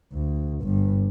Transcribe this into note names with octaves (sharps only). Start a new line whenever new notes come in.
D2
G1 G2